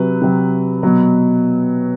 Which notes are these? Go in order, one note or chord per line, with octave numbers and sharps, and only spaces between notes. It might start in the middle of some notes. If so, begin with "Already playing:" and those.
Already playing: C3 F#3 B4
C3 F#3
B2 F#3